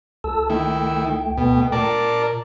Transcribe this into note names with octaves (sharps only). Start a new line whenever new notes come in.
C#2 A4 A5 E6
D#3 A3 E4 G5
D2 B2
A#2 A#4 D5 A5